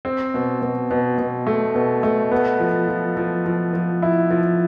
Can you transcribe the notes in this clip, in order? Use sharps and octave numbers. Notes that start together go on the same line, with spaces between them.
C4
B2
B2
B2
B2
A3
B2
A3
B3
F3
F3
F3
F3
F3
E4
F3